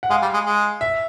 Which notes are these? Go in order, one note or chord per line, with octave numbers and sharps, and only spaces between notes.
F#5
G#3 F5
G3
G#3
G#3
E5